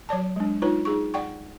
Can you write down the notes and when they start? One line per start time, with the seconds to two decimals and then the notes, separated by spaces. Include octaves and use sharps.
0.09 F#3 C#5 D5 A5
0.36 G#3 D4
0.62 D#4 F4 B4 C#5
0.85 D#4 G#4 C#6
1.14 D5 F#5 G5 C#6